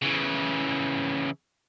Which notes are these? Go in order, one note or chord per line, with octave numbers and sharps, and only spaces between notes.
C#3 E3